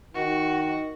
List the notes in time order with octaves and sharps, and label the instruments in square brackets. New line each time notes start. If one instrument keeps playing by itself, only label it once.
[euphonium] D#3 [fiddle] F#4